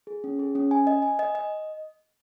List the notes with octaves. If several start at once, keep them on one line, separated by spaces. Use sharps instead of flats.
G#4
C#4
G#4
C#4
G#5
D#5
G#5
D#5
D#5